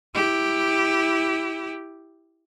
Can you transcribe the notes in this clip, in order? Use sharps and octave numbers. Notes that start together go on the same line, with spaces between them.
E4 G4